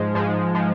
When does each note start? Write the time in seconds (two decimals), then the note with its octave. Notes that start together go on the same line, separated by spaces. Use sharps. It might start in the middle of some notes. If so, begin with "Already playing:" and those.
Already playing: G#2 F3 G#3
0.15 G#2 F3 G#3
0.55 F3 G#3